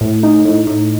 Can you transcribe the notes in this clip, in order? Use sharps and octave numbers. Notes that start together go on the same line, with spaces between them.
A2
D#4
A2
A2